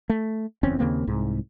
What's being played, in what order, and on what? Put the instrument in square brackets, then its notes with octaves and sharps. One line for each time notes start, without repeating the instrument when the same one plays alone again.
[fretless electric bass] A3
F#1 E2 C4 C#4
D#2 C#3 A#3 C4
C2 G#2